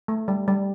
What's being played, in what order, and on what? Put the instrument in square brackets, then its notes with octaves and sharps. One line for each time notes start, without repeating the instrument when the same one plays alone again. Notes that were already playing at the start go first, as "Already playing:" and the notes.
[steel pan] A3
G3
G3